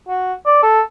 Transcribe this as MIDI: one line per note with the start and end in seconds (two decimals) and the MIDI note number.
0.08 0.33 66
0.46 0.62 74
0.63 0.82 69